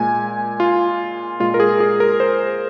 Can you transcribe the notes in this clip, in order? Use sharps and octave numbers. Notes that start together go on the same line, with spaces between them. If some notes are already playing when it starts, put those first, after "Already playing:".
Already playing: A#2 G#3 G#5
F4
A#2 G#3 F4
A#4
G#4
G#4
A#4
C5